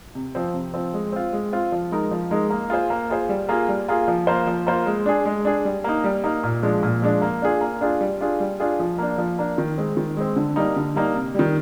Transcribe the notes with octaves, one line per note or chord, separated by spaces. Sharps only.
C3
F3 C4
C3
F3 C4
G#3
C4 F4
G#3
C4 F4
F3
G#3 D#4 A#4
F3
G#3 D#4 A#4
A#3
F4 G#4 C5
A#3
F4 G#4 C5
G3
A#3 F4 G#4
G3
A#3 F4 G#4
F3
A#3 F4 C5
F3
A#3 F4 C5
G#3
D4 G#4
G#3
D4 G#4
G3
A#3 D#4
G3
A#3 D#4
A#2
F3 G#3 D4
A#2
F3 G#3 D4
A#3
D4 F4 G#4
A#3
D4 F4 G#4
G3
D4 F4 G#4
G3
D4 F4 G#4
F3
A#3 D4
F3
A#3 D4
D#3
G#3 C4
D#3
G#3 C4
D3
G3 A#3 D#4
D3
G3 A#3 D#4
C3
D#3 G3